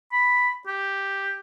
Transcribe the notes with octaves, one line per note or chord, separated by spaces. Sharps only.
B5
G4